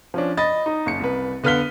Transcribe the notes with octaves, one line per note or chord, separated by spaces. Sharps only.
F3 C#4 D4
D#5 B5 A6
D#4
F#1 C#7
C2 B4
D3 B3 F5 F6 B6 G7